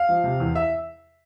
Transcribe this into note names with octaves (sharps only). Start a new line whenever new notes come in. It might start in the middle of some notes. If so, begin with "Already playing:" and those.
Already playing: F5
F3
C3
E2
E5